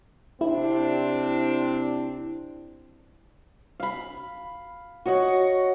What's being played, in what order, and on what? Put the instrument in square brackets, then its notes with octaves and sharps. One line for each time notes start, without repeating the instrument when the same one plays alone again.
[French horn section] C3 C4 D4 [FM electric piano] E4
[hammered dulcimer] F5 B5
F#4 C#5 D#5 F#5